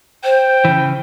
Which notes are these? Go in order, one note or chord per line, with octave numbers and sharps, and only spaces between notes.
C5 G5
C#3 E3